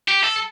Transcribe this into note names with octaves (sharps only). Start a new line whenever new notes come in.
G4
A4